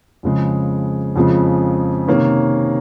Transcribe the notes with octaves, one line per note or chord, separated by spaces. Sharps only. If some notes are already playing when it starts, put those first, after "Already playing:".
F2 C#3 F3 G#3
F2 C#3 F3 G#3
C3 D#3 A#3 C#4